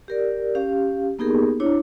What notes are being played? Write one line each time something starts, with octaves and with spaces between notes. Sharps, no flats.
G4 A#4 D5
C#4 G4 F5
A#3 B3 D#4 G4 G#4 A#4
D4 E4 C#5